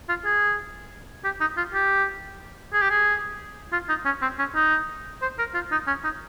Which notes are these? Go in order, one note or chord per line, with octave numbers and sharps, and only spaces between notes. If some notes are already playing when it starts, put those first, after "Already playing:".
F4
G#4
G4
D#4
F4
G4
G#4
G4
G#4
F4
D#4
C#4
C4
C#4
D#4
C5
A#4
F4
D#4
C#4
D#4